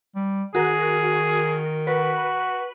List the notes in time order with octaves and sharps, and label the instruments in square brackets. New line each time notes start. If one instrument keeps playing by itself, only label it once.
[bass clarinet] G3
[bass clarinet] D#3 [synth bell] F#4 A#4 [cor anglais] G#4
[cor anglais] F#4 [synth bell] B4